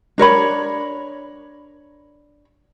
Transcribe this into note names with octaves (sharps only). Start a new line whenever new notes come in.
D4 A#4 C#5 B5